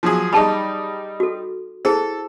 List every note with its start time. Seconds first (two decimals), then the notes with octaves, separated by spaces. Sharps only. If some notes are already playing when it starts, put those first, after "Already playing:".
0.03 F3 F#3 G#4
0.33 G3 D#4 G#4 A5 B5
1.20 F#4 A4
1.85 E4 G#4 A4 C5